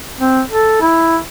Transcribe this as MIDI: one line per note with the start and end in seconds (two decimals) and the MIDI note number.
0.18 0.41 60
0.50 0.80 69
0.81 1.17 64